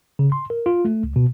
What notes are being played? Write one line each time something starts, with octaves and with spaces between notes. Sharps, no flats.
C#3
C6
A#4
F4
A3
C#2
B2